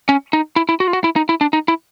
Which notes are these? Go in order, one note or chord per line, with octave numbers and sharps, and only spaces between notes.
C#4
D#4
E4
E4
F#4
F4
F#4
E4
D#4
E4
D4
D#4
E4